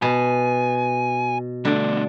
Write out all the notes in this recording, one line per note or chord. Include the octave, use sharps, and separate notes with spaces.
B2 G#5
D3 G3 A3